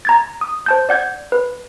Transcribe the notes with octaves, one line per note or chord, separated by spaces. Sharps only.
A#5 G#6 A6
D#6
C5 A5 G6
D5 F#5 G6 G#6
B4